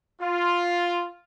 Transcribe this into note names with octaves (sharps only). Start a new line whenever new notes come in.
F4